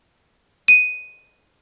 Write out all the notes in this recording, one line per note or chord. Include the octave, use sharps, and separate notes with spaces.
D#7